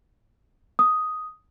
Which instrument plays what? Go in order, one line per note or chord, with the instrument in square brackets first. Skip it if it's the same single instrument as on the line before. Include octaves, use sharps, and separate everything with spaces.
[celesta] D#6